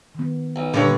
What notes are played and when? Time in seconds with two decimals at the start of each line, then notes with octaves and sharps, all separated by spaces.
0.15 D#3 B3
0.56 B1
0.74 G2 A#2 D3 C#4 C#5